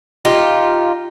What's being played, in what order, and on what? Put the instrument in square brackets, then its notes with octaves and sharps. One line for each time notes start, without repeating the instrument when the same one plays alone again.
[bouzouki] D#4 F4 G4